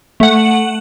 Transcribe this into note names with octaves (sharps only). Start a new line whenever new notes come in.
A3 F#5